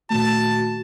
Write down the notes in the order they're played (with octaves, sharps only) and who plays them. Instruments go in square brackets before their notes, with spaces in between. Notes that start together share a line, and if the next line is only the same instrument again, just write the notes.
[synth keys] A#2 D#3 A3 [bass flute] F#4 [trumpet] A5